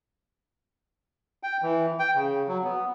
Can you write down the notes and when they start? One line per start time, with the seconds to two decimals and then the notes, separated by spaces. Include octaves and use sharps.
1.43 G5
1.62 E3
1.99 G5
2.16 C#3
2.48 F#3
2.64 B3